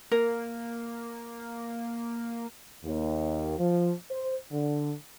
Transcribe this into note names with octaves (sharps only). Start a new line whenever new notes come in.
A#3 A#4
D#2
F3
C5
D3